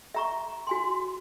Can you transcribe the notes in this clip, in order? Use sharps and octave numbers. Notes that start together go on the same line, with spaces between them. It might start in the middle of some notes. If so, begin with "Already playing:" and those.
E5 A#5 C#6
F#4 G#5 C6